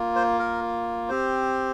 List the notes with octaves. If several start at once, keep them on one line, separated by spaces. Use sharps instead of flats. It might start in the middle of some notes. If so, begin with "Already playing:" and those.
Already playing: A#3 F4
C5
A#4
C4 G4 C5